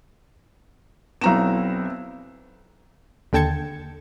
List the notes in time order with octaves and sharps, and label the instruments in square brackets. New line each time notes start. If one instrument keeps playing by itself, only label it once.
[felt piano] B1 A#5 E7 [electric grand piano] B3 C4 E4
[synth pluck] D#2 D3 G5 A5 G#6 C#7